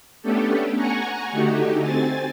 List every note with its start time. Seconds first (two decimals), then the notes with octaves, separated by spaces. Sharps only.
0.22 A3 B3 C#4 D4 G4 A4
0.76 F#5 G#5 A#5 C#6
1.32 D3 A3 D#4 F#4 G4
1.82 C4 G#5 A6